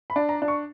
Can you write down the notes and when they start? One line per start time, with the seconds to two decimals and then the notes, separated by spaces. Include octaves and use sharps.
0.10 B5
0.16 D4
0.29 A#5
0.42 D4
0.48 C#6